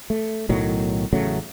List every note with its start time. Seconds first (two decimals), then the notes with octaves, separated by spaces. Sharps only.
0.10 A3
0.49 B1 A2 D#3 F#3
1.13 A1 C#3 F#3 A3